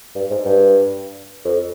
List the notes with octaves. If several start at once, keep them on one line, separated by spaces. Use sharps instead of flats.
G2
G#2
G2
F2